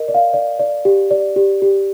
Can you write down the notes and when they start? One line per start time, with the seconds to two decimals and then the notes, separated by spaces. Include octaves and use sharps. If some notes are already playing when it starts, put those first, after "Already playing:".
Already playing: A#4 D#5
0.08 D5
0.14 F5
0.34 D5
0.59 D5
0.85 G4
1.11 D5
1.36 G4
1.62 G4